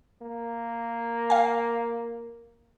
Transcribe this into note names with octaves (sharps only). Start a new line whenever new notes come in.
A#3
F5 G#5